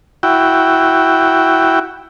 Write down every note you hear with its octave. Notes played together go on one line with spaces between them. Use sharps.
E4 F#4 G5